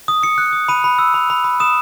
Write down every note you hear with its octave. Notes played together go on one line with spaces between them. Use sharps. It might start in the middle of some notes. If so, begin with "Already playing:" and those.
D#6
D#6 C#7
F#6
D#6
B5 D#7
B5
E6
B5
B5
B5
D#6 E7